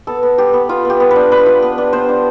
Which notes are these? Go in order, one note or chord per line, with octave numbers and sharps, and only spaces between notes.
B3 A4
B3
B3 G4
B3
B3 F4
B3
G4
B3
B4
D4
D4 B4
F4
B3
D4
B3 C5
D4